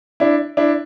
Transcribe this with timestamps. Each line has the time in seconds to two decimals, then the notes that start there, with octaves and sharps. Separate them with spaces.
0.20 D4 E4
0.57 D4 E4